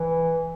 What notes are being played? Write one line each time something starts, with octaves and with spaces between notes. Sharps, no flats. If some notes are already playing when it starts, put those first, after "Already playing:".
Already playing: E3